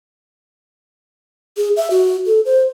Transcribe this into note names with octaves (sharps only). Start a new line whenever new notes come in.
G#4
E5
F#4
A4
C5